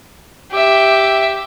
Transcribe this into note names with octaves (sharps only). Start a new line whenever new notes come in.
G4 E5